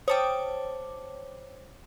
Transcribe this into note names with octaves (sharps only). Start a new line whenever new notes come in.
C5 C#5 G5 A5 D6 D#6